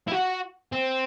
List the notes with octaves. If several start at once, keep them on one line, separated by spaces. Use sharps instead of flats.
E4
F#4
C4